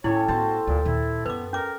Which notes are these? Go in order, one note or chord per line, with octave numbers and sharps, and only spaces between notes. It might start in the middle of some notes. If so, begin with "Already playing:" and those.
A2 C#4 E4 G4 A4 C#5
A2 B3 F#4 C5 A5
D2 A#2
D#2 A#2 E4
F#2 B3 B4 D6
C#4 A#4 D6